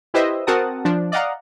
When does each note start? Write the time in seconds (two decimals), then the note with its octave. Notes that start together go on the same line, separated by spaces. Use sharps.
0.14 E4 G4 B4 C5 D#5 E5
0.47 C4 F#4 A#4 F#5 A5 D#6
0.85 F3 D4
1.12 D5 D#5 F5 F#5 A#5